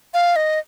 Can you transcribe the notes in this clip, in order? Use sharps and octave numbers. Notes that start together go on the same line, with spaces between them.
F5
D#5